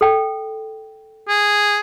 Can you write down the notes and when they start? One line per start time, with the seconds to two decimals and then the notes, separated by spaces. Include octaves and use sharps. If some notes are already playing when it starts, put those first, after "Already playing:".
0.01 A4 G5
1.28 G#4